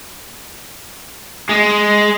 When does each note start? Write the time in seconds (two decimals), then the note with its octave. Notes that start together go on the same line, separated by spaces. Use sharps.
1.49 G#3